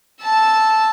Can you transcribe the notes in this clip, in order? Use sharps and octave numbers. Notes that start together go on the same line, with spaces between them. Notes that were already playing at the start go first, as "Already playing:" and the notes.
A5 E6